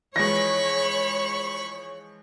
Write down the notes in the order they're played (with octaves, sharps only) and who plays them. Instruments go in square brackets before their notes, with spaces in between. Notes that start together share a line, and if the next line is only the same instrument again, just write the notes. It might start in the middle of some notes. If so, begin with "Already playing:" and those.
[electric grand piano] E3 F3 G#3 [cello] C#5 [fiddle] B5 C#6 [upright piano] A#6